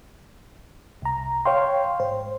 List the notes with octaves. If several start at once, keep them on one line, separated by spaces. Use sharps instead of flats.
C2 A#5
C#5 F5 G5 C6
G#2 C5